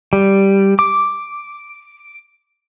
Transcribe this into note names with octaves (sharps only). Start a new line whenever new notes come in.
G3
D6